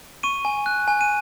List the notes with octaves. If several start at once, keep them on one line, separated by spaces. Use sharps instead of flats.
C#6 D#7
G#5
F#6
G#5
D#7